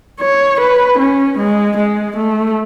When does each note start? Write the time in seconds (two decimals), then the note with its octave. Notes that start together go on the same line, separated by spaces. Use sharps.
0.21 C#5
0.60 B4
0.99 C#4
1.38 G#3
1.77 G#3
2.16 A3